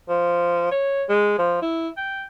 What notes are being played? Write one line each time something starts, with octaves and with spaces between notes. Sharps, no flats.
F3
C#5
G#3
F3
E4
G5